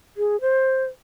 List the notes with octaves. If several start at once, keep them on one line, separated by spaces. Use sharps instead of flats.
G#4
C5